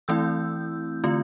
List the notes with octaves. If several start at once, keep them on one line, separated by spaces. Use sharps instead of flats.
E3 A3 C4 E4 E6 G6
D3 A3 C4 F4